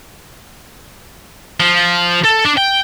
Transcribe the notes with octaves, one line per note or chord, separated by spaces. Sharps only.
F3
A4
D4
G5